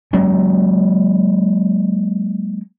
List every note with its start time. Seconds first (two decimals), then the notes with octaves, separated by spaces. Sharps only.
0.13 F#3 G#3 A#3 C#4